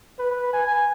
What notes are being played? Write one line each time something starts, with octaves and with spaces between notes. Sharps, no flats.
B4
G#5